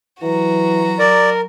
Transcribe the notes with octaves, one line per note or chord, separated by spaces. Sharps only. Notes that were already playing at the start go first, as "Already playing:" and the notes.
E3 F#3 F#4 A#5
A#4 D5